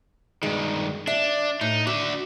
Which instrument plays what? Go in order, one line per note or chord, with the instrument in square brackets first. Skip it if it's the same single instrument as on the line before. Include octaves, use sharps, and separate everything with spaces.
[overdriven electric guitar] G2 D#3 [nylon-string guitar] G#3
[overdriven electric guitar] D4 [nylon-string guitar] E5
[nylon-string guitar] A2 [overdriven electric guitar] D#4
[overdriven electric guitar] D4 E5 [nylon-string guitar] F#4